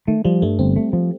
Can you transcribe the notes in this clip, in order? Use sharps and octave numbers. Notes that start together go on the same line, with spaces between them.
D#3 A3
F3 G3
G2 A3
G1 C4
A3
F3